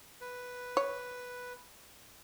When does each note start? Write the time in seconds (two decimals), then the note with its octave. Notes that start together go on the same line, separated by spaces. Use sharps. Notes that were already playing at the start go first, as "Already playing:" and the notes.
0.21 B4
0.77 C#5